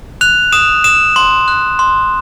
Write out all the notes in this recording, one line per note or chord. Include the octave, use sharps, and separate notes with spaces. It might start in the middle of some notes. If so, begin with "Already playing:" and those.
F#6 F7
D#6 E7
D#6 E7
C6
F#6
C6